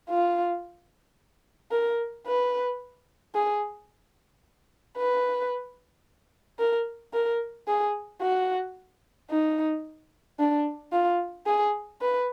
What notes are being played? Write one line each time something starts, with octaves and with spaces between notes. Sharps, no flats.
F4
A#4
B4
G#4
B4
A#4
A#4
G#4
F#4
D#4
D4
F4
G#4
B4